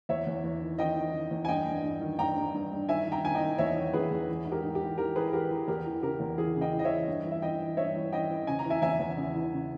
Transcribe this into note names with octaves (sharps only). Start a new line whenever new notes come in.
E2 C#5 E5
E2
E2
D#3
D#3 D#5 G5
D#3
D#3
E2
G#5
G2 D#5 G5
G2
G2
D#3
G2 G5 A#5
G2
G2
G2
D#3 E5 G#5
D#3
G5 A#5
D#3 G#5
D#5 G5
D#3
E2 C#5 E5
D#3
E2 G#4 B4
E2
E3
G#2
G4 A#4
G#2
G4
E3
E3 G4 A#4
E3 G#4 B4
E3 G4 A#4
E3
E2 G4 A#4
E3
C#3 G4 A#4
E2
E3 G#4
C#3
D#5 G5
E3
D#5
C#5 E5
E3
G2
E3
E5
E3 D#5 G5
E3
G2 C#5 E5
E3
E3 D#5 G5
E3
C#3 G#5
A#5
E3
E5 G#5
E2 E5 G#5
E2
C#3
E3
C#3